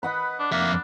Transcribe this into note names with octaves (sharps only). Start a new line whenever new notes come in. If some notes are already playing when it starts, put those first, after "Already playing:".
B4 D#5 F#5 B5
D4
F2 A#3 D4 E5